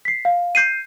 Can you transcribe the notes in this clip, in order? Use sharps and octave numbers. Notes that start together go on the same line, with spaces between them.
B6 C7
F5
G6 C7 D#7